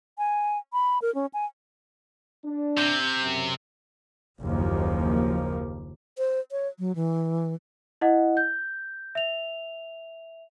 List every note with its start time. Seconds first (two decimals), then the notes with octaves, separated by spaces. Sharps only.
0.18 G#5
0.73 B5
1.02 A#4
1.15 C#4
1.34 G#5
2.45 D4
2.77 C3 G6
3.21 F#2
4.41 F#1 D#2 F3 A#3
6.18 C5
6.51 C#5
6.79 F#3
6.95 E3
8.01 E4 D#5 F#5
8.37 G6
9.15 E5 F7